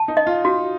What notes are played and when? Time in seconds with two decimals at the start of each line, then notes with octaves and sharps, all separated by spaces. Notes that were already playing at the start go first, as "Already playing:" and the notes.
Already playing: A5
0.08 D#4
0.17 D#5
0.27 F4
0.45 D#4 F#4